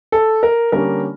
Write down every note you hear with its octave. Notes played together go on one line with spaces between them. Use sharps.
A4
A#4
D3 G3 A#3 C#4 A#4